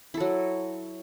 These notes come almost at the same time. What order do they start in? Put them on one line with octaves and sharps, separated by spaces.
E4 A4 F#3